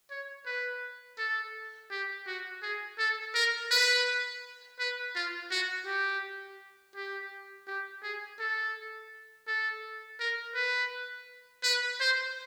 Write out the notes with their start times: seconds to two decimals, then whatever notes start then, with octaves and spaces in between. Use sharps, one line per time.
0.11 C#5
0.46 B4
1.18 A4
1.91 G4
2.27 F#4
2.62 G#4
2.98 A4
3.35 A#4
3.71 B4
4.79 B4
5.15 F4
5.51 F#4
5.86 G4
6.95 G4
7.67 G4
8.03 G#4
8.39 A4
9.47 A4
10.20 A#4
10.55 B4
11.63 B4
12.00 C5